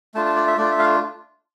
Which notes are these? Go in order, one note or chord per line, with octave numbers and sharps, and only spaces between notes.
A3 D4 F4 A5
A5
D5
E5
A3 D4 F4 D5
E5
F5